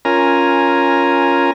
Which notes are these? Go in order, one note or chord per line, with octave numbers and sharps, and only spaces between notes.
C#4 F4 A#4 G#5 A#5